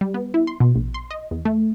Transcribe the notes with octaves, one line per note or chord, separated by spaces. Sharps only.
G3
B3
E4
C6
B2
A#1
C6
D#5
E2
A3